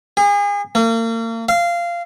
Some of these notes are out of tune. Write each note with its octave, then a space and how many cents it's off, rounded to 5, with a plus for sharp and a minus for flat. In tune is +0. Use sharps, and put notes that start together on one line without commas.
G#4 -35
A#3 -40
F5 -15